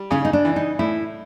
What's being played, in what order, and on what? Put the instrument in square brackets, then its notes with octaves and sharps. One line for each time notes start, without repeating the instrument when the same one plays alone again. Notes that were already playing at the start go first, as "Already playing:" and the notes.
Already playing: [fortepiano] G3
[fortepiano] C#3 [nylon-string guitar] C#4
[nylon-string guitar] D#4
D4
[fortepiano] E3
[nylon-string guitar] D#4
[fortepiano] A2 [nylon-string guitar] E4